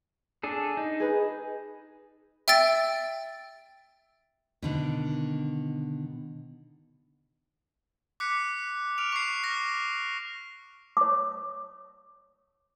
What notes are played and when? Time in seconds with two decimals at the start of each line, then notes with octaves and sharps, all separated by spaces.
0.43 D4 G#4 A4
0.77 D#4
1.00 G#4 B4
2.48 E5 G5 E6 A6 D7
4.62 B2 D3 D#3
8.20 D6 F#6 B6 C#7
8.98 F6 D7 F7
9.12 C#6 C7
9.43 F6 A#6
10.97 C#5 D6